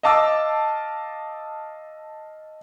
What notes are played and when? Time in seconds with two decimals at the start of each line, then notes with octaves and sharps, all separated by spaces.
0.03 D#5 F5 A5 D6 E6